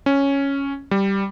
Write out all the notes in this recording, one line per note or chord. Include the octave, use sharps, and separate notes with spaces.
C#4
G3